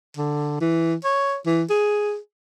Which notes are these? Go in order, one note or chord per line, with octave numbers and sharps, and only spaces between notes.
D3
E3
C#5
E3
G#4